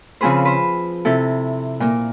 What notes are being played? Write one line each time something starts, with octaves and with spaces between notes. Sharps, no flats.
C#3 F3 C4 G#4 B4 C5
B4 C5
C3 C4 E4 A4
A#2 A#3